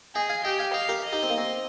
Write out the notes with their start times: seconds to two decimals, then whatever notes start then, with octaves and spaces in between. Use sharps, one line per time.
0.15 G#4 D#5 G5
0.29 F5 G#5
0.44 G4 D#5 G5
0.59 F5 G#5
0.74 D#5 F5 G5
0.89 G4 A#4
1.03 D#5
1.13 D#4 G4
1.23 C4
1.30 A#3
1.38 C4